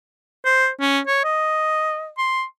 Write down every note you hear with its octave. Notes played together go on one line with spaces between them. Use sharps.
C5
C#4
C#5
D#5
C6